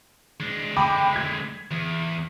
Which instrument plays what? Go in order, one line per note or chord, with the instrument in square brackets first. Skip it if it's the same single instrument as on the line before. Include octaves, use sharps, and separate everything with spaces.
[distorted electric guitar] G#3 D4
[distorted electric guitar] D3 G#3 [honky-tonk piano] G5 B5 D6
[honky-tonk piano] G#6 B6
[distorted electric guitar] E2